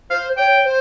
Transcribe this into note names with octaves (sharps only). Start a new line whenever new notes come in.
C5 F5
C#5 G5
C5